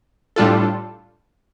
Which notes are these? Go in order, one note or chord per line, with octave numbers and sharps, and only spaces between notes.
A2 G3 D4 F4 A4